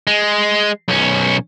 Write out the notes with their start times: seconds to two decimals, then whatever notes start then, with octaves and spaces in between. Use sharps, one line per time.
0.07 G#3
0.88 B1 C#4